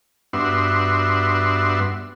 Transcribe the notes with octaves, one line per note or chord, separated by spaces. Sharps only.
G2 B3 D4 F#4 E5 C6